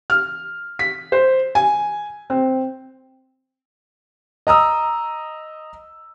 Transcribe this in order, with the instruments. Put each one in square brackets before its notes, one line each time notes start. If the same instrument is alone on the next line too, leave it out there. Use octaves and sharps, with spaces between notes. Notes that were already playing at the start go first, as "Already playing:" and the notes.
[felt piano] F6
B6
C5
G#5
C4
[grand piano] D#5 A#5 D#6 E6